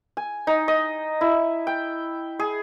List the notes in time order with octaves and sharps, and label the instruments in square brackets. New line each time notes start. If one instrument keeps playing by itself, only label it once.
[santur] G#5
D#4
D#5
E4
G5
G#4